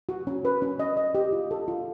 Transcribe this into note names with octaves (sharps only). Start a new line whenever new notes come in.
F#4
C#4
B4
C#4
D#5
D#5
G4
F4
A4
F4